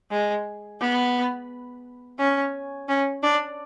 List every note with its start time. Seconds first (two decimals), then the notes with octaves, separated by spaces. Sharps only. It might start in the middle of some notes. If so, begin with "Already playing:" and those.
0.11 G#3
0.80 B3
2.19 C#4
2.88 C#4
3.23 D4